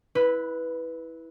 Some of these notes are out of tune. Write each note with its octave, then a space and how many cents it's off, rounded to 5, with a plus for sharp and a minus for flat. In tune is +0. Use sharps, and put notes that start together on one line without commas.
E4 -15 B4 -5 B5 +35